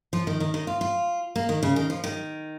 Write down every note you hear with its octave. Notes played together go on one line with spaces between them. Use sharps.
F3
D#3
D#3
D#3
F4
F4
A#3
D#3
C#3
D#3
F3
D#3